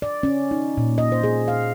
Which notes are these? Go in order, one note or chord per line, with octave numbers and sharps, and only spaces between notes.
D5
C#4
D#4
A#2
D#5
C5
G#4
F5